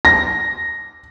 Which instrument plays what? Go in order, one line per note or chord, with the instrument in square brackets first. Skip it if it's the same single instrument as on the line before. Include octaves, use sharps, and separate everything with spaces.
[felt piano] A#6